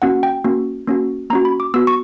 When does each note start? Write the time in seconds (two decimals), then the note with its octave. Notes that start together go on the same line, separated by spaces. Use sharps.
0.02 A#3 C#4 F#4 F#5
0.23 G5
0.44 A#3 C#4 F#4
0.87 A#3 C#4 F#4
1.30 A#3 A#5
1.33 C#4 F#4
1.45 B5
1.60 D6
1.74 B3 F#4 E6
1.87 C#6